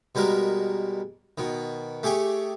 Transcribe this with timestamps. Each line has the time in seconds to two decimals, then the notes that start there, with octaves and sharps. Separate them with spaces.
0.15 B2 G3 G#3 A#4
1.38 B2 D#3
2.03 A3 G4 G#4 G5 C#6